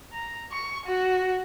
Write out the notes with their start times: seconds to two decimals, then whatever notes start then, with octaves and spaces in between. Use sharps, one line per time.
0.13 A#5
0.52 C#6
0.85 F#4